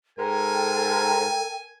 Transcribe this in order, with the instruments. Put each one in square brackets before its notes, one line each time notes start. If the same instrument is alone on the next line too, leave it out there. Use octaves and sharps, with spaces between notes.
[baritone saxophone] G#2 [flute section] A4 G5 [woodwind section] A#4 [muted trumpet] G#5